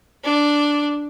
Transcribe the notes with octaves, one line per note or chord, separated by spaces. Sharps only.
D4